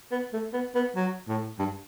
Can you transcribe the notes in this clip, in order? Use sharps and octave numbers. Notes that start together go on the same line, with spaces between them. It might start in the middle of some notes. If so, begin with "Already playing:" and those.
B3
A3
B3
B3
F#3
A2
G2